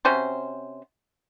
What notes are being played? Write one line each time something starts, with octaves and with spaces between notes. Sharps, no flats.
C3 C#4 F#4 C5